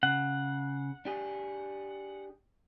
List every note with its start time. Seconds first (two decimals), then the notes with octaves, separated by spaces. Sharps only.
0.03 C#3 F#5
1.05 D4 G4 G#4